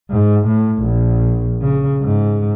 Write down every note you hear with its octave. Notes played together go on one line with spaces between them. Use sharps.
G#2
A2
A#1
C#3
G#2